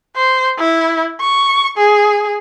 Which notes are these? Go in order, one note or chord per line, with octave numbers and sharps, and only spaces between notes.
C5
E4
C#6
G#4